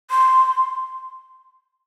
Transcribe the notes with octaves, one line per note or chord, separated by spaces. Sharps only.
C6